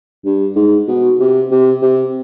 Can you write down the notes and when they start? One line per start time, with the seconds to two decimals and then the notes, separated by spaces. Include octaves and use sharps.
0.25 G2
0.56 G#2
0.88 B2
1.20 C3
1.51 C3
1.82 C3